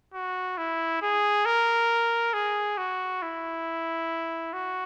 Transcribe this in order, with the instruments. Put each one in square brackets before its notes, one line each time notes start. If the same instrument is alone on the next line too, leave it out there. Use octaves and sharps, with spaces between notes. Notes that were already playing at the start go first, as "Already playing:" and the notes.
[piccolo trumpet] F#4
E4
G#4
A#4
G#4
F#4
E4
F#4